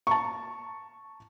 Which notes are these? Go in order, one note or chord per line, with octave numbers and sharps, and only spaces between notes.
A5 A#5 C#6